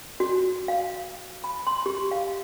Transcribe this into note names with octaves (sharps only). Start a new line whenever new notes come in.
F#4
F5
B5
C6
G4
F5